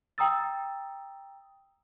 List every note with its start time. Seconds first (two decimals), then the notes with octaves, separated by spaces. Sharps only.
0.18 G5 A#5 D#6 E6 A6